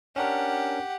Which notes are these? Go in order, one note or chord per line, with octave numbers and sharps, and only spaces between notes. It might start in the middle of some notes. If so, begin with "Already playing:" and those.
C#4 D4 G4 A#4 F#5